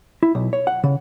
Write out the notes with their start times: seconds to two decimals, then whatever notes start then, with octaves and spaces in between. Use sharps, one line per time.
0.23 E4
0.35 B1
0.53 C#5
0.67 F#5
0.84 C#3